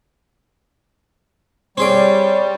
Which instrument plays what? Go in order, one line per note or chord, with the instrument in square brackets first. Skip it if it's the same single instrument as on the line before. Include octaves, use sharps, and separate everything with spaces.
[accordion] G3 [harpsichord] C4 G#4 D5 [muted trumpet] C#5